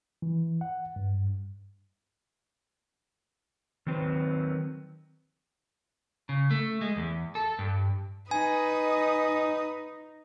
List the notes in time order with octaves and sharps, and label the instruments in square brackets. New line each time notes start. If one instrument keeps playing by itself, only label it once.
[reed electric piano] E3
F#5
G2
[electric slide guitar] D#3 F#3 C4 B4
C#3
A3
G#3
E2
A4
G2
[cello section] D#4 [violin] B4 D#6 [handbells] G#5